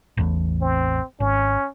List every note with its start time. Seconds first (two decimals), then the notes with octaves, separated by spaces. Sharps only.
0.17 A1 E2 A2
0.62 C4
1.20 G#1 C#4